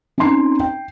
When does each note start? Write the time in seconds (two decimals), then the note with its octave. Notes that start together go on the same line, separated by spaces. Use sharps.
0.18 C4 C#4 D#4 A#5 C6 C7
0.60 G5